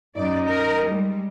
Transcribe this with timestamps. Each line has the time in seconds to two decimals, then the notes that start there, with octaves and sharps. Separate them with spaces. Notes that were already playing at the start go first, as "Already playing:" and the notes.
0.17 F#2 D#4 D5
0.49 A#4
0.90 G3 G#3